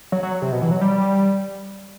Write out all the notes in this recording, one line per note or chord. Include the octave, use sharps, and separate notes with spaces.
F#3
F#3
C3
B2
E3
F#3
G3